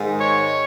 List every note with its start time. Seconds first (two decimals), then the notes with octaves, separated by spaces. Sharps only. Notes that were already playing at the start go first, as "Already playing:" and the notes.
Already playing: G#2 D#3 G#3
0.20 C#5